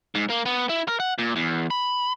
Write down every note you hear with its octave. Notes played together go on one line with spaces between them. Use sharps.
G#2
A#3
B3
E4
A#4
F#5
A#2
E2
B5